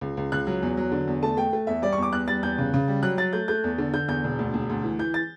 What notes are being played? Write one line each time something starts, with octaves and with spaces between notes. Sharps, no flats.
C#2
C#2
C#2 F#6
F#3
E2
F#3
D3
E2
A3 A5
A3 G5
A3
E2 E5
G3 D5
C#6
E2 D6
E2 F#6
G3 A6
E2 G6
C#3
C#3
G3
F#3 F#6
F#3 A6
A3 G6
A3 G6
E2
D3
D3 G6
E2 G6
E1
D2
E1
D2
E3
E3 G6
A6